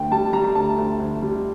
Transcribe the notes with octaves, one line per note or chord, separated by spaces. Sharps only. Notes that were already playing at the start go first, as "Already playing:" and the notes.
Already playing: D2 G5
G3 A5
G3 A#5
A#5
D2 A5
D2
D2
G3